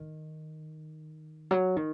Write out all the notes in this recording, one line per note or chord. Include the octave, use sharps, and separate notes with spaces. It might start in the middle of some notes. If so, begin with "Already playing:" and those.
Already playing: D#3
F#3
D#3